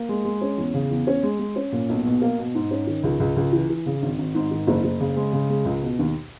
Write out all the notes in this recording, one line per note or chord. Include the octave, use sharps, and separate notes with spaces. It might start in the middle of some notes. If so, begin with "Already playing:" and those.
Already playing: A#3
G#3
G#3
C#4
E2
C#3
E2
C#4
G#3
G#3
C#4
A#2
B1
B2
A#3
B2
G#2
C#4
D#3
C#2
C#2
C#2
E3
E3
C#3
G#1
G#1
G#2
D#3
F#1
F#1
C#3
G#3
C#3
G#3
C#2
B2
D#2